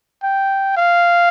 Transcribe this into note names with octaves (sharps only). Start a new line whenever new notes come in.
G5
F5